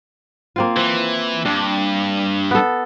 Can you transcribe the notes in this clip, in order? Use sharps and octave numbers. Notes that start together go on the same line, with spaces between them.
A#3 C4 F4
E3 C5
G2 D4
B3 A4